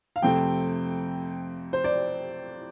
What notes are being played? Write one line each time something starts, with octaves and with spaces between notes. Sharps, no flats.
F5
F2 C3 A3 C4 G5
C5
D5